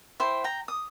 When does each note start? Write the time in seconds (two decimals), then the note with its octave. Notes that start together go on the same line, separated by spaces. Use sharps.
0.20 E4 C5 G5
0.44 G5 A#5
0.68 D#6